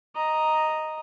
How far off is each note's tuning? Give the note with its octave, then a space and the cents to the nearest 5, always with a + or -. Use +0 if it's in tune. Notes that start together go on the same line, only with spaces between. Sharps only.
D#5 +0 A#5 +0